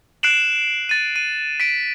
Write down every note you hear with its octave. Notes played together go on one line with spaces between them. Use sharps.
F#6 C7 D7 E7 F#7
A6 D#7
D#7
B6 D7